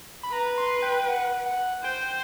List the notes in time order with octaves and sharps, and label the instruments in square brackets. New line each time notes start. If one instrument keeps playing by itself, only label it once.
[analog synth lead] B5
[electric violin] B4 [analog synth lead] A#5
[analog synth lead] C6
G5
F#5
F#5
[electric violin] C5 [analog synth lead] G5